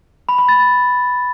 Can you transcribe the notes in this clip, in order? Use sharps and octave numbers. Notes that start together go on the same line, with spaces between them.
B5
B5
A6